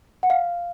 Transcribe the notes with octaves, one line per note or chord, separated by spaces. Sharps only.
F#5
F5